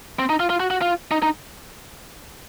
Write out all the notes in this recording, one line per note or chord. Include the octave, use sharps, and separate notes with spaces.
C4
D#4
F4
F4
F#4
F#4
F4
D#4
D#4